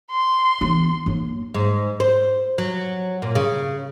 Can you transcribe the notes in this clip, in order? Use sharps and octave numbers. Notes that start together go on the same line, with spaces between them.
C6
E3 B3
F#3 A#3
G#2
C5
F#3
A#2
C#3